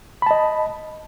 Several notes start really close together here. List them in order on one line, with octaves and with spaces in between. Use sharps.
B5 A5 D#5